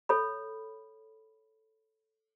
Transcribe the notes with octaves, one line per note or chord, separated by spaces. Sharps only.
A4 C#5 B5